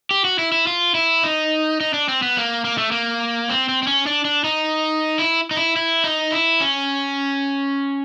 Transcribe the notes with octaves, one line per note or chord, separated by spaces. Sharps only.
G4
F#4
E4
E4
F4
E4
D#4
D#4
D4
C4
B3
A#3
A#3
A3
A#3
C4
C4
C4
C#4
D4
D4
D#4
E4
D#4
E4
E4
D#4
E4
C#4